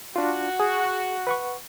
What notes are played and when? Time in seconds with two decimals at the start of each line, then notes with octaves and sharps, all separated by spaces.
0.16 D4 F4 F#4
0.60 G#4
1.27 B4 F#5 C#6